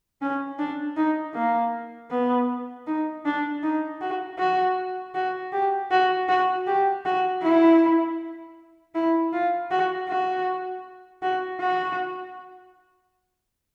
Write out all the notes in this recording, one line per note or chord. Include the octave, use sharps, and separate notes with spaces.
C#4
D4
D#4
A#3
B3
D#4
D4
D#4
F#4
F#4
F#4
G4
F#4
F#4
G4
F#4
E4
E4
F4
F#4
F#4
F#4
F#4